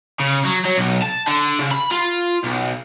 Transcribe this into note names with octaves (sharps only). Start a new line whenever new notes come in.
C#3
F#3
F#3
B1
A5
D3
C#3
B5
F4
B1